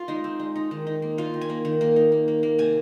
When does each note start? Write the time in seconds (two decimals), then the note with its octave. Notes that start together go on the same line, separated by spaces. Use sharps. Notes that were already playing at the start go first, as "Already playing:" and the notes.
Already playing: F4
0.08 G#3 D#4
0.24 C4
0.40 G#3
0.56 D#4
0.71 D#3
0.87 D#4
1.02 A#3
1.18 A#3 F4
1.34 D#3
1.41 G#5
1.50 A#3
1.65 D#3
1.81 A#3
1.96 D#4
2.12 A#3
2.28 A#3
2.43 A#3
2.59 C3 G#5